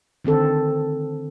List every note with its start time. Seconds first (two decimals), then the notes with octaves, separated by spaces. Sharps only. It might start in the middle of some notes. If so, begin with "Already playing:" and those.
0.25 D3 D#3 C4 A4